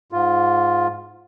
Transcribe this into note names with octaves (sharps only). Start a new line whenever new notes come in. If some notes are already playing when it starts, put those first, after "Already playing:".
G#2 F4